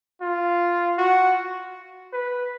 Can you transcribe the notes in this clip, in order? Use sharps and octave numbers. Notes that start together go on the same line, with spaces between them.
F4
F#4
B4